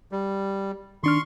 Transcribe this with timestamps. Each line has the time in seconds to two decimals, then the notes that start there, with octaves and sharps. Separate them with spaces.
0.12 G3
1.03 D#3 D4 C6 C#6 F6